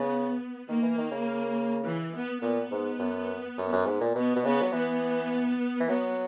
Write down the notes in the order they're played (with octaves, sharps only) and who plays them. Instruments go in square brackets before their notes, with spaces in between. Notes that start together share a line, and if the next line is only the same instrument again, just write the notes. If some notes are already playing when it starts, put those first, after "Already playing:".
Already playing: [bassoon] C#3 [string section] B3
[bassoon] D#3 [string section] A#3
[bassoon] E3
D#3
C#3
[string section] E3
B3
[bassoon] A#2 [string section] B3
[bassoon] G#2
F#2
F#2
F#2
G#2
A#2
[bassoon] B2 [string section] B3
[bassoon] B2
[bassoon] C#3 [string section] B3
[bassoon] F#3
[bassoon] E3 [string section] B3
[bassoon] E3
[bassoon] F#3 [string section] B3